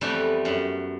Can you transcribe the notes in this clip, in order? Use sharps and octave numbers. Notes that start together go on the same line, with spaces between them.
F2 E3 G3 A3 B3
F#2